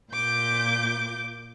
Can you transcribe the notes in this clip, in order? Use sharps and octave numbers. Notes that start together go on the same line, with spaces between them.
A#2 D6 G6